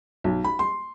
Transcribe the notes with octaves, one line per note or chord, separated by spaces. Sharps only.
B1
B5
C6